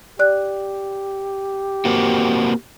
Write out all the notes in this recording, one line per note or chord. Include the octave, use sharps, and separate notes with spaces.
G4 D5 F#6
A#3 C4 F#4